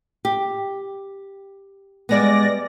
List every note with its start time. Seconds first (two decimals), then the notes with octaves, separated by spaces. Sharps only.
0.25 G4
2.09 G3 G#3 B3 D5 A#6